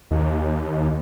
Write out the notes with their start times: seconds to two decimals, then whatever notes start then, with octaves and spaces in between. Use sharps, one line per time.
0.11 D#2